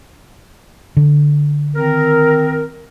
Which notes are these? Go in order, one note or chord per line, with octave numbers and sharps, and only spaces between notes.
D3
D#3 C4 A#4